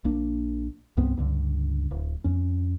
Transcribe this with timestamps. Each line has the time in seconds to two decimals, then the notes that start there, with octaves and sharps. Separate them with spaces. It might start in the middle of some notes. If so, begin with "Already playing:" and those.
0.04 A#1 A#3 D4
0.97 C2 G2 B3 C4
1.17 C#2 G2 D3
1.91 D1
2.24 F2 C#4